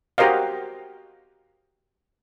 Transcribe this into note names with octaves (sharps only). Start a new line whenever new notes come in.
F#4 G4 A#4 C5 D#5 F5